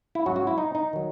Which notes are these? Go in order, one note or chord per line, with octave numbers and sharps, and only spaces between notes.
E4
G#2 F#3 C#4 F#4
F#4
E4
D#4
D#4
D#3 F#3